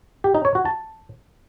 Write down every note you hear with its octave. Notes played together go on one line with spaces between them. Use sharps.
G4
D#4
C#5
F#4
A5